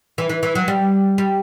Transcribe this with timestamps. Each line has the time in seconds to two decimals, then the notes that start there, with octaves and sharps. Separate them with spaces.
0.18 E3
0.29 E3
0.43 E3
0.55 F#3
0.68 G3
1.18 G3